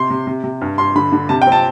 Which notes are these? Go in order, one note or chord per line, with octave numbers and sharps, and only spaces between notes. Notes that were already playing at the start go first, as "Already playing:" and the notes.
Already playing: C3 C6
C3
C3
C3
G2
G2 C6
D3 B5
D3
C3 A5
G5
C4 A5